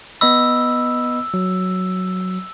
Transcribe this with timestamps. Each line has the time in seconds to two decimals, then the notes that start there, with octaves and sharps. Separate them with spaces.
0.21 B3 D#5 B5 E6
1.34 F#3